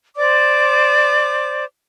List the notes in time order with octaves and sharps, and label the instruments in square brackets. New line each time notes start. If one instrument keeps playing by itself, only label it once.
[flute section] C5 D5 D6